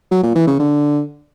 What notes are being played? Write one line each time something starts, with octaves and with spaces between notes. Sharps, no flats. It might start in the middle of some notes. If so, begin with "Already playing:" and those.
F#3
A#2
E3
C#3
D3